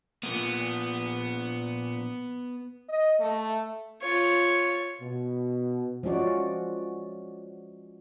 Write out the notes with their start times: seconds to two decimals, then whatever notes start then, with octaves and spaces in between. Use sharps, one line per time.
0.23 A#2 F3 A#3 B3
2.89 D#5
3.20 A3
4.01 F4 C#5
5.01 B2
6.03 F3 G#3 C#4 F#4 D5